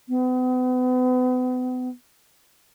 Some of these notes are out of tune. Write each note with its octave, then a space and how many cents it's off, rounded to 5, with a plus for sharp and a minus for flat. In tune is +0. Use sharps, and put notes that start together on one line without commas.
B3 +40